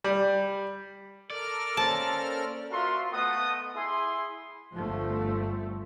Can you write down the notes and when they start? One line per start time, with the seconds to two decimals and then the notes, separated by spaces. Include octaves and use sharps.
0.04 G3
1.30 A4 A#4 D5 F6
1.77 A#3 C#4 C5 A5
2.71 F4 F#4 A#4 E5 A#5 C6
3.12 A3 B3 D#5 F#5 D#6
3.75 E4 G#4 E5 G#5 C6
4.75 G1 F3 A3